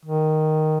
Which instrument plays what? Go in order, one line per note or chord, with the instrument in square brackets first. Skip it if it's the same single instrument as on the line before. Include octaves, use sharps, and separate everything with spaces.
[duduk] D#3